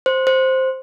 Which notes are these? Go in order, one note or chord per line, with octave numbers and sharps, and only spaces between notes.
C5
C5